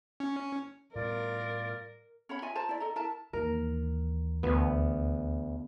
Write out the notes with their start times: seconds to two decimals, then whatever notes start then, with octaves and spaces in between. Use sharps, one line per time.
0.20 C#4
0.95 A2 G3 B3 F4 A#4 D5
2.29 C#4 C#5 F#5 B5
2.42 F4 D#5 E5 G#5
2.55 F4 C5 A5 A#5
2.69 E4 D5
2.80 A4 D#5 A#5
2.96 E4 A#4 A5
3.33 D#2 E3 A#4
4.43 D2 B3